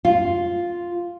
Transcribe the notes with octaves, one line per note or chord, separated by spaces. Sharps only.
F4